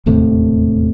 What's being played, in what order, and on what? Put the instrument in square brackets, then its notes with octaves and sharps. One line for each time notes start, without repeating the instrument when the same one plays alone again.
[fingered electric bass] E1 D#2 A2 C3